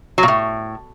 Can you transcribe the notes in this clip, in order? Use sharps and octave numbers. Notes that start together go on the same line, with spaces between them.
F#3
A#2
A2